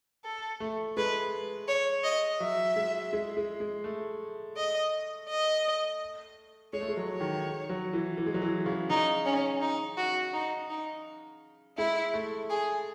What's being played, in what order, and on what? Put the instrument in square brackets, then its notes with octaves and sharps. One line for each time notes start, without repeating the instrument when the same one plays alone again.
[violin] A4
[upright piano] A3
[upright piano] G#3 [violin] B4
[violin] C#5
D#5
[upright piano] F#3 [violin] E5
[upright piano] G#3
G#3
G#3
G#3
A3
[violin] D#5
D#5
[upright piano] G#3 [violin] C#5
[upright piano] A3
G#3
F#3
[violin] C#5
[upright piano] D#3
F#3
E3
E3
G#3
F#3
E3
C#3
[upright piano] C#3 [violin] D#4
[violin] C#4
D#4
F#4
D#4
D#4
[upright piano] G#3 [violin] E4
[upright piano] A3
[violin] G#4